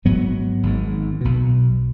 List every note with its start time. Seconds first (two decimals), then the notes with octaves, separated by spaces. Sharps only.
0.05 G#1 G#2 F#3 B3
0.63 G#1 G#2
1.21 B1 B2